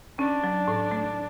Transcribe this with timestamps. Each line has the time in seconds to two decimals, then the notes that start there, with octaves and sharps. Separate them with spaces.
0.19 C#4 D4
0.44 F#3
0.68 A2
0.91 A3